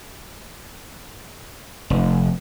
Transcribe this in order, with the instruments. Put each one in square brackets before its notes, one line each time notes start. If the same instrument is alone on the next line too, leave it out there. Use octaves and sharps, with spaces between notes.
[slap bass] F1